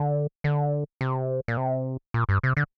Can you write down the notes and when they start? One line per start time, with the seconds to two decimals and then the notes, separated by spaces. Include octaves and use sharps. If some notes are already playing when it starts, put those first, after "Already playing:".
Already playing: D3
0.44 D3
1.01 C3
1.48 A#2
1.57 C3
2.14 A#2
2.29 G2
2.43 C3
2.57 D3